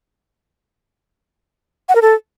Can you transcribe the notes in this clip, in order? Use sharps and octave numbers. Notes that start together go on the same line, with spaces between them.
F#5
A#4
A4